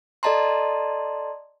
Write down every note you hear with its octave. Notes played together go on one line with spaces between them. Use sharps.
A4 D5 D#5 A5 A#5 C6